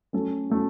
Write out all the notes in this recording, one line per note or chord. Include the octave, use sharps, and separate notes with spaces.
F#3 A3 C#4 A4
F#3 A3 C#4 A4